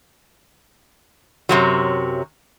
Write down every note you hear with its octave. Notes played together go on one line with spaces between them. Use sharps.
F#2 C3 F#3